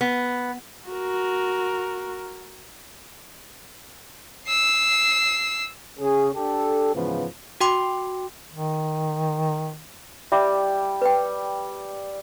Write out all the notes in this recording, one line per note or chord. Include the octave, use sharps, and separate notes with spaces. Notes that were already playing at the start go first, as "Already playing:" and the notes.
B3
F#4 A#4
E6 C7
C#3 C#4 G#4
D4 G4 A4
G#2 C#3 E3 F3 B3
F#4 G5 C6 D6
D#3
G3 E5
B4 G5